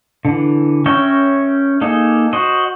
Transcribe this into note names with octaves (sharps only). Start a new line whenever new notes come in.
D3 E3
C#4 A#4 C#5 E5 G5
A#3 D#4 G#4 A4
F#4 C5 D#5